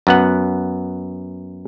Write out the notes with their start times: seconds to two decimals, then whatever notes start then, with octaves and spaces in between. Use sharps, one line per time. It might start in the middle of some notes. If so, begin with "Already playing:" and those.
0.07 F#2 B3 F#5